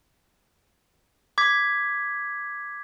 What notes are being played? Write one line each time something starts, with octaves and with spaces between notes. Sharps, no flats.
D6 G#6 B6